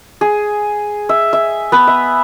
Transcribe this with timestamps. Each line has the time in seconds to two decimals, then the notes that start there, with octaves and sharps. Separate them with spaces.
0.21 G#4
1.09 E5
1.33 E5
1.72 B3 B4
1.87 E5